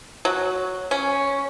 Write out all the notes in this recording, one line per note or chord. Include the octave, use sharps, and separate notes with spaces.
F#3
C#4